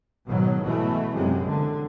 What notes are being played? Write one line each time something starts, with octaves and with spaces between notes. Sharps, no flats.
G#2 B2 D#3 F#3
B2 E3 A3
F#2 C3 G#3
D3